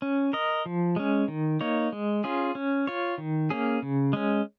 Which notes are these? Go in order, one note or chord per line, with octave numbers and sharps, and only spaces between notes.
C#4
A#4 D#5
F3
G#3 C#4
D#3
A#3 D#4 C#5
G#3
C#4 F4 G#4
C#4
F4 C#5
D#3
A#3 C#4 G#4
C#3
G#3 C#4